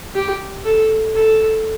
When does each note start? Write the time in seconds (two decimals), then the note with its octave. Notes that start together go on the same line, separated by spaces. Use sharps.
0.15 G4
0.65 A4
1.15 A4